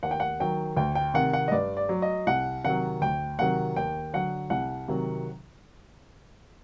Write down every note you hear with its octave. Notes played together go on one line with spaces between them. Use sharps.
D#2 F#5
G5
F#5
D#3 F#3 G5
D2 G5
G5
C3 D#3 F#5
F#5
D#5
G2 D5
D5
F#3
D#5
C2 F#5
C3 D#3 F#3 F#5
D2 G5
C3 D#3 F#3 F#5
D#2 G5
D3 F#3 F#5
C2 F#5
C3 D#3 F#3